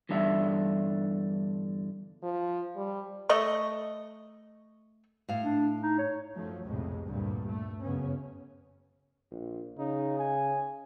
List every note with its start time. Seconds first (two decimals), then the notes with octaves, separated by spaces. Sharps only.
0.09 E2 G2 D3 D4 E5
2.23 F3
2.76 G3
3.29 A3 D#5 C#6
5.29 A2 F5
5.44 D4
5.82 D#4
5.99 C#5
6.34 F#2 F3 F#3 A3
6.64 B1 F2 A2 C3 G#3
7.04 D2 G2 A#2 G3
7.47 A3
7.82 F#2 C#3 B3 C#4
9.31 A#1
9.79 C#3 D#4
10.19 G#5